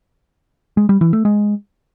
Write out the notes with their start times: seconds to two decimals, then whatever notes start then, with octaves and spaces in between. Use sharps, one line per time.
0.77 G#3
0.89 G3
1.01 E3
1.13 A3
1.25 G#3